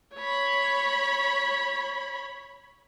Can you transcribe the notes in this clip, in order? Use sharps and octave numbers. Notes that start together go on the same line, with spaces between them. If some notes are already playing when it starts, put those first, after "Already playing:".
C#5 B5